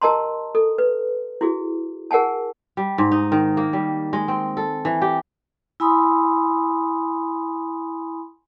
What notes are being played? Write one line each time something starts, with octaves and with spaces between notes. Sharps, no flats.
G4 A#4 D#5 A5 A#5 C6
A4
B4
E4 F#4 G#4
G#4 A#4 F#5 G#5 A5
G3
G#2
D#4
D#3
A#3
G3
G#3
C4
A4
E3
G4
E4 G#5 B5 C6 D#6